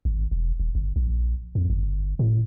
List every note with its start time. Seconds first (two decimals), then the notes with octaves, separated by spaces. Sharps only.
0.05 G#1
0.31 E1
0.60 D#1
0.75 G1
0.96 A#1
1.55 F2
1.70 G1
2.19 A2